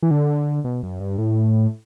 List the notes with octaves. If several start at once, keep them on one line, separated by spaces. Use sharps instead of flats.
E3
D3
B2
F#2
G2
A2